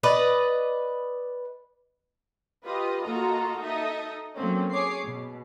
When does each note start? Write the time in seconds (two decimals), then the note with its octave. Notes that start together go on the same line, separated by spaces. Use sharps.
0.03 B4 D5 D#5
2.65 F4 G4 B4 D#5
3.03 A#3 F4 F#4 A4 D#5 A#5
3.61 D#4 A4 D#5 E5
4.36 F#3 A3 A#3 C4 C#4
4.71 G#4 C#5 D6 C7
5.05 B2